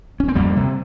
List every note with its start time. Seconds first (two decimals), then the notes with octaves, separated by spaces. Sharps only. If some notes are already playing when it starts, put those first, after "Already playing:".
0.20 C#4
0.28 C4
0.35 F2 G3 A#3
0.56 C3